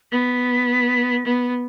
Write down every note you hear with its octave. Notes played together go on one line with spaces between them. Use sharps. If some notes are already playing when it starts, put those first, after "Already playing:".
B3 B6
B3